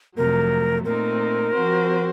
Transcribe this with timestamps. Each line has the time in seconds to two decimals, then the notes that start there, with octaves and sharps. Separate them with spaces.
0.16 F2 C3 F#3 A3 A#4
0.85 A#2 A3 C4 D#4 A#4
1.53 F3 C4 F#4 C5